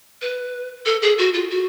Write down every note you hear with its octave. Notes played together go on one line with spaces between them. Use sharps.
B4
A4
G#4
F#4
F4
F#4